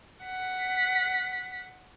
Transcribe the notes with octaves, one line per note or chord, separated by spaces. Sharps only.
F#5 B6